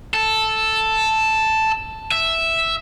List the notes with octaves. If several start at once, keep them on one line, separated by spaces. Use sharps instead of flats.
A4
E5